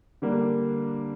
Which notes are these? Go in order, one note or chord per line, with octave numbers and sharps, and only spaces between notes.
D3 G3 A#3 D4